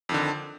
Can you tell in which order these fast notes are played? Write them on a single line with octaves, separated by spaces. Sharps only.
F2 D#3 D3